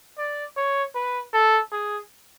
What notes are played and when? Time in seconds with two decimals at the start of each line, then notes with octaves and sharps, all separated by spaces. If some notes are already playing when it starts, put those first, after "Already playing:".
0.18 D5
0.57 C#5
0.94 B4
1.33 A4
1.71 G#4